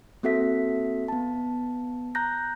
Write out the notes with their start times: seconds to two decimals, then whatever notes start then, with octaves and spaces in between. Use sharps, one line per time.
0.23 A#3 C4 F#4 A4 E5 B6
1.08 B3 A5
2.15 A#5 F#6 G6 A#6